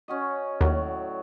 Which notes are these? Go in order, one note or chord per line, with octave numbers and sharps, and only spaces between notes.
C#4 F#4 D#5
D#2 A2 F#3 D5